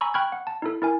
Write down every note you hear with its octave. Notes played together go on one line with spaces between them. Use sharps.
G#5 A#5 B5 C#6 E6
G5 B5 C#6 F6 F#6 G#6
F#5
A5
D#4 E4 A4
E4 A#4 G#5